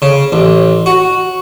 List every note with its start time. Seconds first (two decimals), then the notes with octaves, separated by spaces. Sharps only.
0.02 C#3
0.32 A1
0.86 F#4